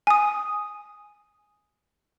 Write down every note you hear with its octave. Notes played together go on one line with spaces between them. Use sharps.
G#5 D#6